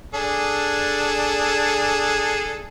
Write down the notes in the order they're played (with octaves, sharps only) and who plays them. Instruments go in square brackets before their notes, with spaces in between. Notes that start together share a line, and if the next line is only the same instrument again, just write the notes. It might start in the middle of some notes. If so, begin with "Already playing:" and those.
[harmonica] D4 G#4 A4